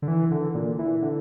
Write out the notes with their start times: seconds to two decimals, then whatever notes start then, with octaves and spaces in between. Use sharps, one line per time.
0.02 D3
0.08 E3
0.31 D3
0.55 A#2
0.79 E3
1.02 D3